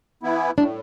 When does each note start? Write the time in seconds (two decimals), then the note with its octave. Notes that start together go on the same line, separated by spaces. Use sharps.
0.23 E3 B3 E4
0.57 A2 D4